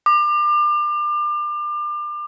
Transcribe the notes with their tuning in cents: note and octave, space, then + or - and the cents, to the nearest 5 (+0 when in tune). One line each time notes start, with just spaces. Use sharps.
D6 +30